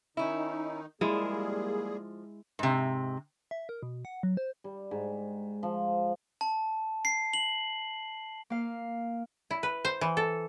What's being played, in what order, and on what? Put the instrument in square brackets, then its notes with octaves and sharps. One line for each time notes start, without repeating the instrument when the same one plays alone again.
[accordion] D#3 D#4 [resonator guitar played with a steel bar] C#4 E4
[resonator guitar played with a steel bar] F3 [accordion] G3 A#3 G#4 [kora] G#3 E4
[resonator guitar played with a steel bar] G#2 C3
[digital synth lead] E5
A#4
B2
F#5
F#3
C5
[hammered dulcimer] G3
G#2
F3
[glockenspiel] A5
C7
F#7
[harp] A#3 F5
[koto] E4
B4
C5
E3
A4